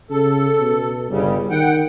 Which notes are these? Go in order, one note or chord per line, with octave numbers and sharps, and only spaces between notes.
C#3 A4
B2
G1 C#3 G3
D#3 F#5 G5